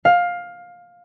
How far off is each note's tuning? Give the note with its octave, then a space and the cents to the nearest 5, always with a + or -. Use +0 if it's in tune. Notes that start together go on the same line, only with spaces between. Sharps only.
F5 +15